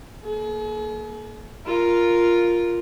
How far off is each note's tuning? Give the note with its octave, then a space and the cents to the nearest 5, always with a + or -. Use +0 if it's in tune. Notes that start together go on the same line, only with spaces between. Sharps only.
A#3 +0 G#4 +45
F4 +0 A#4 +0